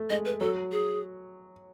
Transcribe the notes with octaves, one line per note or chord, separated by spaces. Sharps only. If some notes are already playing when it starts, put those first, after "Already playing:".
Already playing: A3
G#3 D#5
B4
F#3 A4
G#4